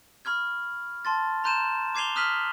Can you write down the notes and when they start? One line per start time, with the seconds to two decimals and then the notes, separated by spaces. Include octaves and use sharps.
0.25 B5 C#6 F6 G#6
1.05 A5 C6 A6
1.44 A#5 C6 F#6 G6 D#7 E7
1.95 D6 G#6 C7 D#7 F7 G7
2.16 D#6 F6 F#6 B6 D#7 F#7